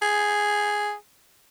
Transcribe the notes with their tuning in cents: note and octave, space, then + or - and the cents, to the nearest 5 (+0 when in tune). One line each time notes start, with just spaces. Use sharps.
G#4 +0